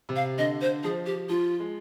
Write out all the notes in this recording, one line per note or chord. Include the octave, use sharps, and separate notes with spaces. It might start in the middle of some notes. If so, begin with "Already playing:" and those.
C3
F5
D3 D#5
C5
F3 G#4
G4
F3 F4
G#3